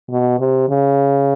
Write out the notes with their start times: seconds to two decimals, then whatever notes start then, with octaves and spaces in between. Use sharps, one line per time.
0.10 B2
0.40 C3
0.69 C#3